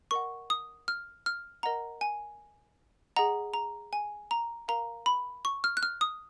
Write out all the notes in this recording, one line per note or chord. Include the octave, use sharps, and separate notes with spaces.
A#4 D#5 F#5 C#6
D#6
F6
F6
A#4 D#5 F#5 A#5
G#5
G#4 D#5 F#5 A#5
A#5
G#5
A#5
A#4 F5 A#5
B5
C#6
F6
F#6
F6
D#6